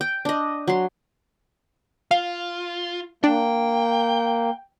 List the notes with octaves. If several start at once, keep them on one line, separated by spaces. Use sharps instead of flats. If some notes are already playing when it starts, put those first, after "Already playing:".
G5
D4 D#5
F#3 C6
F4 F5
A#3 D4 G5